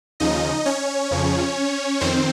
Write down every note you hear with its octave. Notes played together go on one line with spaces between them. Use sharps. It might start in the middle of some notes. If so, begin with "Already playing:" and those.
D#2 C#3 F3 D#4 D#5
C#4 C#5
F2 C#3 F3
F2 D#3 C4 C5